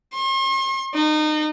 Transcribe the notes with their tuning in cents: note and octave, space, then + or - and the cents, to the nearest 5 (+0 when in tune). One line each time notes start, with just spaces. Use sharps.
C6 +45
D#4 -30